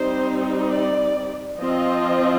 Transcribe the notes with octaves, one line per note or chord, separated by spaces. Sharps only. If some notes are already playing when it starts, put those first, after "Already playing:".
Already playing: G3 C4 D#4 C5
D5
F3 C4 F4 D#5